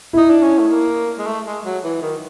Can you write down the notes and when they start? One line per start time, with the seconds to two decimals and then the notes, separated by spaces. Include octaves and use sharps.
0.13 D#4 E4
0.30 D4
0.42 C#4
0.59 A3
0.71 A#3
1.18 G#3
1.27 A3
1.46 G#3
1.65 F#3
1.84 E3
2.02 D#3